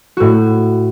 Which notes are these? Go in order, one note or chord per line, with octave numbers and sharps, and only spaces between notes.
A2 F#4